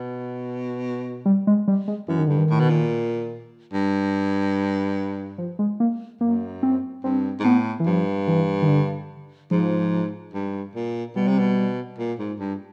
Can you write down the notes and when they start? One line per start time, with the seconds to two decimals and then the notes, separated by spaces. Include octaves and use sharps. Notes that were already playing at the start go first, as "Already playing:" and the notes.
Already playing: B2
1.26 G3
1.47 G#3
1.68 G3
1.88 G#3
2.08 F#2 E3
2.19 D#3
2.28 G2 D3
2.38 D#3
2.50 A2
2.60 B2
2.70 A#2
3.73 G2
5.38 F3
5.59 G#3
5.80 A#3
6.21 F#2 A#3
6.63 C4
7.04 G2 C4
7.39 G#2
7.44 A2 B3
7.80 E3
7.86 G2 F3
8.28 E3
8.62 D#3
8.68 D3
9.51 G#2 F3
10.34 G2
10.75 A#2
11.16 B2 G3
11.28 C3
11.39 B2
11.99 A#2
12.19 G#2
12.39 G2